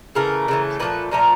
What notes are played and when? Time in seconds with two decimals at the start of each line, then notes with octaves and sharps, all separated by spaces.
0.15 C#3 E3 A3 A#4
0.48 C#3 E3 A3
0.80 A#2 F3 A3 B4
1.11 A#2 F3 A3 A#4